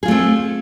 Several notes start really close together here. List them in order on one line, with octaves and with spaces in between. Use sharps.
G#4 F4 A3 C4